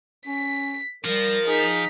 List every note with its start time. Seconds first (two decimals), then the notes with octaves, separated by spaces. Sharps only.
0.27 C#4 B6
1.05 F3 G3 A#4 A#6
1.47 D#4 G#4 B6